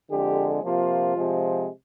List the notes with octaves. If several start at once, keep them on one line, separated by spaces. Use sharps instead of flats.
F2 D3 G#3 G4
C3 F3 A#3 F4
C3 F3 G#3